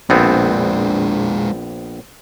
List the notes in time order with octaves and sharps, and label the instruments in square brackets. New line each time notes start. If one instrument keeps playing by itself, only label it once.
[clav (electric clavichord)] A#1 B3 C4 [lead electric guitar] G#3 D4